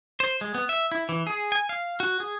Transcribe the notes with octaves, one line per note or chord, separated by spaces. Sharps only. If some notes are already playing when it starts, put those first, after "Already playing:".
C5
G#3
B3
E5
E4
E3
G#4
G#5
F5
F#4
G#4